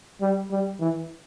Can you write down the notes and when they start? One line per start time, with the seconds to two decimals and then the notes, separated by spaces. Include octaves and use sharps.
0.21 G3
0.51 G3
0.80 E3